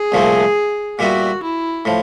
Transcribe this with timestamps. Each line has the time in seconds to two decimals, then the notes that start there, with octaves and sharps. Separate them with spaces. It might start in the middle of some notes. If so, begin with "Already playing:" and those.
Already playing: G#4
0.12 C2 A#2 F3 A3 C4
0.99 A#2 G3 B3 E4 F#4
1.43 E4
1.85 A2 F3